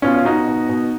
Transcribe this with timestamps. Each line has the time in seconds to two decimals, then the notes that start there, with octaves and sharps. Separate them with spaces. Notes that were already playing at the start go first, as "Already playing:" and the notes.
0.02 B2 C#4 F4
0.14 F4
0.25 B2 D#4 F#4
0.48 B2
0.69 B2